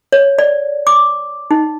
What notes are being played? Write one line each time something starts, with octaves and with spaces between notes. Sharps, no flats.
C#5
D5
D6
D#4